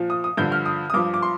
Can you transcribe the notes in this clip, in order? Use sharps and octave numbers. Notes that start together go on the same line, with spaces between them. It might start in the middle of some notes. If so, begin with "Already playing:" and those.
Already playing: A#2 F3
D#6
D#6
G2 D3 F3 G6
F6
D#6
D#6
G2 F3 D6
D6
C6